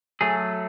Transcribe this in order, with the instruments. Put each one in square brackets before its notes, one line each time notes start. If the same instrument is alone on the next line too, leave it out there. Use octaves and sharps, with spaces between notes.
[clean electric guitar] F#3 A3 G#4